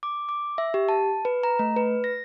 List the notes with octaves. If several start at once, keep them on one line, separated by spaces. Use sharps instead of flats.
D6
D6
E5
G4
A5
B4
A#5
A3
B4
A#6